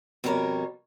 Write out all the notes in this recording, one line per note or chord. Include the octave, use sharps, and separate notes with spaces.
F2 B2 G3 D4 A#4 C#5